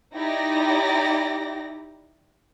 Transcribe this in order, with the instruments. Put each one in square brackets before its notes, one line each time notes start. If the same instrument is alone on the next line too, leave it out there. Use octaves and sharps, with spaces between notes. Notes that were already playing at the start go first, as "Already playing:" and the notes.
[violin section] D#4 E4 G4 D5 A#6